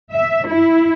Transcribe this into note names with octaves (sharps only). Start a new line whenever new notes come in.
E5
E4